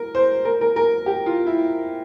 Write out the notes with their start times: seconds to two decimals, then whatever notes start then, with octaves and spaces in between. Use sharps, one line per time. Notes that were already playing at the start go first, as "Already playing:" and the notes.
Already playing: A#4
0.15 C5
0.45 A#4
0.61 A#4
0.76 A#4
1.06 G4
1.26 F4
1.47 E4